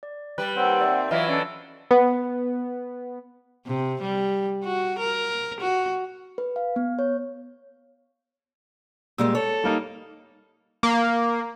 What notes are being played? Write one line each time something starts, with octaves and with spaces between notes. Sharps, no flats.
D5
G3 B4 F#6
D#2 C4 C#5 F#5 E6
D5 E5
E3 F#3 E4 F4 D#5 E5 B5
C#4 D4 A4 D5
B3
C3
G3
F#4
A#4
F#4
B4
F5
B3
C#5
A#2 G3 G#3 E6
A4 C#5
G3 A#3 D#4
A#3